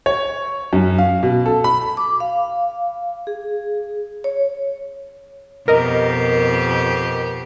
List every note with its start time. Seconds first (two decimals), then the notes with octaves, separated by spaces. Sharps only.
0.06 C#5
0.73 F#2
0.98 F5
1.23 B2
1.46 A4
1.64 B5
1.97 D6
2.20 F5
3.27 G#4
4.24 C#5
5.68 F2 B2 G4 A#4 D#5